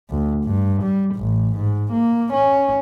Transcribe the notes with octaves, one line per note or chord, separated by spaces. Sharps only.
D2
G2
G3
A1
G#2
A#3
C#4